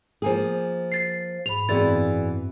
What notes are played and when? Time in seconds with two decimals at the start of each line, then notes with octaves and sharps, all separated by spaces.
0.22 F3 A#3 G#4
0.92 A6 C7
1.46 G#2 B5 F7
1.69 F#2 E3 B3 C4 G#4 D5 A6